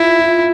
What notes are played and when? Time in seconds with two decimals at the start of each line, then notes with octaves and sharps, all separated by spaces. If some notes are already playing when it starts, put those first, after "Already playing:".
Already playing: E4 F4
0.19 F4